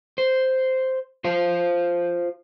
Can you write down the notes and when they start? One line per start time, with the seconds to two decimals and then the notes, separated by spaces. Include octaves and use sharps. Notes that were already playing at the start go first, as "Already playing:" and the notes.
0.18 C5
1.24 F4 C5 F5